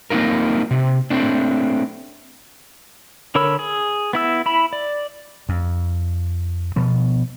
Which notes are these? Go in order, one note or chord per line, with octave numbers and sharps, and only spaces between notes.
A#3 C4 D#4 F4 A#4
C3
A3 C4 D4
D3 A#4 C#5 B5 E6
G#4
B3 E4 E6
E4 B5
D5
F2
B2 F3 B3